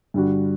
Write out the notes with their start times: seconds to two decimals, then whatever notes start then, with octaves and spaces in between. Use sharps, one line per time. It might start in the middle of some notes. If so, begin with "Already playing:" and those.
0.14 G2 D3 G3 D4 F#4